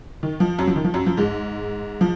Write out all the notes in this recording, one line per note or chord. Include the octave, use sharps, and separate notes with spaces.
D#3
F3
F#2 F#3
F3
D#3
F3
F#2 F#3
F3
G#2 G#3
F3